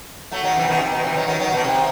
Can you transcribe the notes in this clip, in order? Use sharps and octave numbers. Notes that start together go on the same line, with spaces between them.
F#3 A3
D#3 F#3
C3 E3
B2 D#3
C3
B2 D#3
C3 E3
D#3 F#3
D#3 F#3
D#3 F#3
B2 D#3
C3